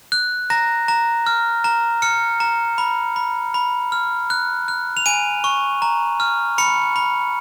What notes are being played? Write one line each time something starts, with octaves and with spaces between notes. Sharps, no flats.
F#6
A#5 A#6
A#5
F6
A#5
F6 C#7
A#5
B5
B5
B5
F6
F#6
F#6
F7
G#5 D#7
C#6
A#5
F6
B5 C#7
B5